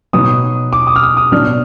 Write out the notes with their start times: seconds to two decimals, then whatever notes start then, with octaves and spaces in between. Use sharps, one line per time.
0.13 B2 F#3 B3 D#4 D#6
0.73 D6
0.87 D#6
0.96 F6
1.03 D#6
1.17 D#6
1.32 B2 F#3 D4 F6